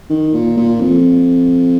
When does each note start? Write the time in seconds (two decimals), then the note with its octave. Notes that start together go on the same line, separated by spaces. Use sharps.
0.10 D#3
0.33 A#2
0.57 A#2
0.81 F2